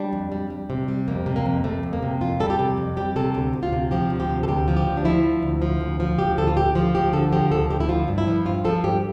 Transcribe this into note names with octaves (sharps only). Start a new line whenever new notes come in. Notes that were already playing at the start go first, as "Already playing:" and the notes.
Already playing: G3 D4
F2
G3
G3
C3
G3
F2 A#3
C3
A#3
F2
C3 A3
F2
A#3
C3
F2 F4
G3 A4
G4
C3
F2
G3 G4
C3 A4
D2 G4
D2
F4
C3
F3 G4
D2
G4
C3
A4
D2 G4
F3
G4
D2
D4
F3 E4
D2
D2
F3
D2
F3
D2 G4
D2 A4
F4
D2 G4
F3 F4
D2 G4
D3 A4
F3 G4
D2 A4
D2 G4
E4
F3 F4
G2
E4
F3
G2 F4
F3 A4
G2 G4